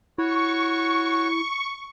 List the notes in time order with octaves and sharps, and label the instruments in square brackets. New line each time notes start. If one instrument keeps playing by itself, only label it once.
[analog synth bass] E4 [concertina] F#4 C#5 [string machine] C#6